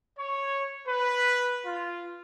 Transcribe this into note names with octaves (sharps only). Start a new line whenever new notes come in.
C#5
B4
F4